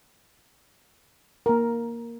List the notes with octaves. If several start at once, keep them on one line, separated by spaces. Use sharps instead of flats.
A#3 A#4